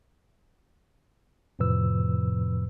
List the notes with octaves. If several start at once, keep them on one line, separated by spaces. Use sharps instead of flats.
F2 A2 C3 F3 B4 E6